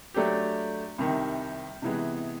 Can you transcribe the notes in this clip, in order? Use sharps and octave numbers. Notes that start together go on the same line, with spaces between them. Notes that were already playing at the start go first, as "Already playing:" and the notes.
F#3 A3 D4 G4
C2 C3 D#3
C3 E3 G#3 B3